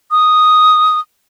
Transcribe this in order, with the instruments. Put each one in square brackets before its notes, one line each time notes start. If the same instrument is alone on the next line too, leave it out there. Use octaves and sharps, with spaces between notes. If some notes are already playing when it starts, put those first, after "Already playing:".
[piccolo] D#6